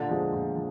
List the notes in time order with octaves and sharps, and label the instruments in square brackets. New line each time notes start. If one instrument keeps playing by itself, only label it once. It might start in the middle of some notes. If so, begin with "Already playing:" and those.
Already playing: [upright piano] A#2 [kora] D3
[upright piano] F3 G#3
A#2
F3